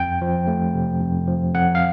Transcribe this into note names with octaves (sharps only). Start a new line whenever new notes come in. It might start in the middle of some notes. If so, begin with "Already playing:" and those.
Already playing: F2 G5
F3
A3
C3
F2
F3
F2 F#5
F5